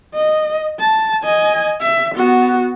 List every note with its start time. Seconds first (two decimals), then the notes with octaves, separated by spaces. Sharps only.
0.14 D#5
0.80 A5
1.24 D#5 G#5
1.80 E5
2.15 B3 F#4